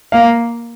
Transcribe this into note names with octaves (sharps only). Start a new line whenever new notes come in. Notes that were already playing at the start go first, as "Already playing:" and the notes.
A#3 F5